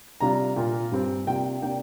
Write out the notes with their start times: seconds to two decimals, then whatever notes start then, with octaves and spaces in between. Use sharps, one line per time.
0.20 C3 G3 D4 F4 A#5
0.57 A#2 A#3 F4
0.91 G2 G3 C4
1.26 C3 A#3 D4 F4 G5
1.62 C3 A#3 D4 G5